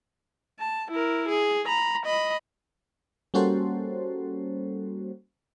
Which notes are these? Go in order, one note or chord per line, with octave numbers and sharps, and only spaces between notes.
A5
E4 A#4
G#4
A#5 B5
D#5 B5
G3 A#3 C#4 F#4 A4 C5